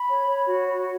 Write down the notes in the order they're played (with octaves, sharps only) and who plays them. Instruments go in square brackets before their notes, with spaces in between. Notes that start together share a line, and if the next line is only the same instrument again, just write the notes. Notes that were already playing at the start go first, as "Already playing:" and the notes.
Already playing: [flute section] B5
C#5
C#5
F#4
C#5